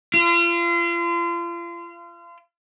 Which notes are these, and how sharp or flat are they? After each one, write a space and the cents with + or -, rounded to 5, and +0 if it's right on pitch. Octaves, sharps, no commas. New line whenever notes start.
F4 -35